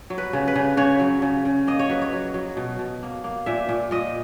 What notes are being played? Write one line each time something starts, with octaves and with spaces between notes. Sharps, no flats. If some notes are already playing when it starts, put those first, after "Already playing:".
F#3
B4
C#3
B4
C#3
C#3 C#5
F#3
C#3
C#3
A#3 D#5
C#5
F#3 B4
C#5
F#3
F#3
B2
B2
A#3
A#3
A#2 E5
A#2
A#2 D#5